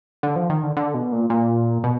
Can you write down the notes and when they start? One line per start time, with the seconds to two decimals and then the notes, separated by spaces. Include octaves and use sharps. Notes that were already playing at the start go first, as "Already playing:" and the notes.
0.23 D3
0.36 F3
0.50 D#3
0.63 D3
0.77 D3
0.94 B2
1.12 A#2
1.30 A#2
1.84 B2